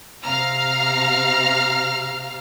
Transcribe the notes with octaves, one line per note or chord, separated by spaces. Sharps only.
C3 F5 A#5 F6